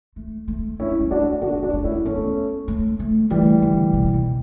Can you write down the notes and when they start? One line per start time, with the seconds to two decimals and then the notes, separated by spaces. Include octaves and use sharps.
0.16 A3
0.48 A3
0.80 A3 C#4 E4
1.00 G3
1.11 D4 F#4
1.21 A3
1.42 B3 D4 F#4
1.58 B3
1.63 D4 F#4
1.73 A3
1.84 C#4 E4
2.05 A3 B3 C#4
2.68 A3
2.99 A3
3.30 E3 G3 A3
3.62 D3
3.93 B2
4.14 B2